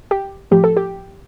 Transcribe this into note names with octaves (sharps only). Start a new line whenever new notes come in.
G4
A2 F3 G4
A4
G4